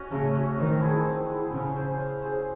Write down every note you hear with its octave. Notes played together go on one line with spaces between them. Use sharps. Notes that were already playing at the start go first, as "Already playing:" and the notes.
Already playing: C#4 F#4 D#5
C#3 A3
C#4 F#4
D#3 C4
E4 G#4
C4
E4 G#4
C#3 C#4
G#4 C5
C#4
G#4 C5